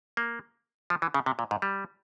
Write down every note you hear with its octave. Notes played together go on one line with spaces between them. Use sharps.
A#3
F3
E3
C#3
C3
A#2
G#2
G3